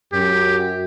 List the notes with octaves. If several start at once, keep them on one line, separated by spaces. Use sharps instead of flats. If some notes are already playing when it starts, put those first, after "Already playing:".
F#2 G4